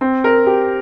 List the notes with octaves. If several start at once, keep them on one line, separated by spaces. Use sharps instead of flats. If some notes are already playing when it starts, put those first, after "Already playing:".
C4
A#4
G4